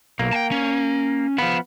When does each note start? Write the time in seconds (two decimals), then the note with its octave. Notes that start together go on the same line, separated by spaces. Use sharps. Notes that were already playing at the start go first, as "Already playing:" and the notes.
0.19 B1 A#3
0.33 G5 A5
0.51 C#4
1.38 F3 B3 F5 B5